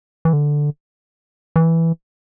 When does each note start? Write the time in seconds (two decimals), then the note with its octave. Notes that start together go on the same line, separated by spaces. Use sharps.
0.25 E3
0.33 D3
1.56 E3